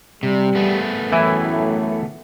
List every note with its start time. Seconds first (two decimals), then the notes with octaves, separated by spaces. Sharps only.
0.23 C3 G3
0.55 A3 B3 G#4
1.12 F#2 A2 E3 E4 G#5